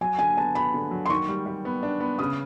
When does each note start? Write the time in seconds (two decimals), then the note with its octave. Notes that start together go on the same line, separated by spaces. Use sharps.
0.01 F#3 G#5
0.19 D3 G#5
0.37 B3 A5
0.55 B3 B5
0.74 D3
0.91 F#3
1.06 C6
1.10 D#3 C#6
1.29 G3
1.46 G3
1.65 B3
1.83 D4
2.00 B3
2.19 C#3 D#6